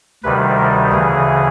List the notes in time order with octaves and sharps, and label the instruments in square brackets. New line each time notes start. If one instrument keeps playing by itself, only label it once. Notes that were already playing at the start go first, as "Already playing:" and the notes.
[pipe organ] D2 C3 D#3 G3 B4
A#4
D2 C#3 E3 G#4